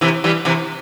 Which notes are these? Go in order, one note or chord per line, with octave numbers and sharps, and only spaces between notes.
C3 E3
E3 G3
C3 E3